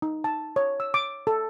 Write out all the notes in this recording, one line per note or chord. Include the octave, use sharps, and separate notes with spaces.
D#4
A5
C#5
E6
D6
A4